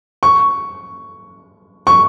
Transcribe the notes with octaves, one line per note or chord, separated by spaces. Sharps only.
C#6
C#6